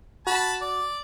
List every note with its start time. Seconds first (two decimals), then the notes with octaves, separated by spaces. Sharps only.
0.27 F#4 A5 B5
0.62 D5